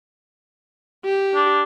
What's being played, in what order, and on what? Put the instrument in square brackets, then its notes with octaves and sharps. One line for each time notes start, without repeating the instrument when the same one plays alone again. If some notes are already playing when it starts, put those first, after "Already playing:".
[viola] G4
[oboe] D4